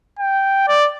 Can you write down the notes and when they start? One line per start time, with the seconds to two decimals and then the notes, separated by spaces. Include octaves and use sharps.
0.19 G5
0.68 D5